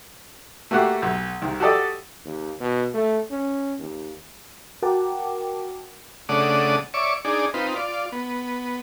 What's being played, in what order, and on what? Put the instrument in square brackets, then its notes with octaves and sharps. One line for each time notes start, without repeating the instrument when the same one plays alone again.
[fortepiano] A3 A#3 F#4 G4 F#5
B1
C2 D#3
F#4 G4 A4 D5 D#5
[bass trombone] D#2
B2
A3
C#4
D#2
[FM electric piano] F#4 A#4 F#5 G5 A5 D6
[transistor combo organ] C#3 A3 D4 D5 F#5 D#6
C#5 D5 E5 C#6 D6
D4 D#4 G#4 D5
C4 D#4 F4 B4
F4 D5
B3